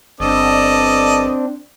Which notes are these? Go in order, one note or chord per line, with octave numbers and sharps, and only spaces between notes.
G1 C4 D4 A4 D5 D#5